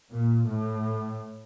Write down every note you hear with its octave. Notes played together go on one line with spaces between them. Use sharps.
A#2
A2